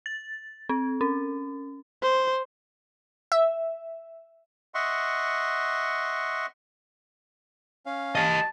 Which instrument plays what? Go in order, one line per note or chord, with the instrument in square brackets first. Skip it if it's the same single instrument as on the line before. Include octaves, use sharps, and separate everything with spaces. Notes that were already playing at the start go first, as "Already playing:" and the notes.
[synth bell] A6
C4
C#4
[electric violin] C5
[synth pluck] E5
[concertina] D#5 E5 F#5 C6 C#6
[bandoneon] C#4 F5
[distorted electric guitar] G4 D#5 [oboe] A5